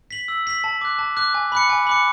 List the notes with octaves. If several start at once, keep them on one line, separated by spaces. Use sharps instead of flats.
B6 F#7
E6
B6 F#7
A5
D6 F#6
A5
D6 F#6
G#5
B5 D6 F#6 C#7
G#5
B5 D6 F#6 C#7